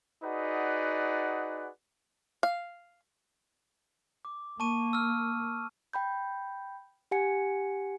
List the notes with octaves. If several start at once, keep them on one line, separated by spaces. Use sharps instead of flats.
D#4 F#4 G#4 B4 D5 F#5
F5
D6
A#3 A5 C#6 D#7
E6 F6
G5 B5 G6
G4 F#5 G#5 C#7